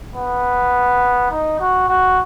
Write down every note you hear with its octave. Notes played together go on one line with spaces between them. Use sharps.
B3
D#4
F#4
F#4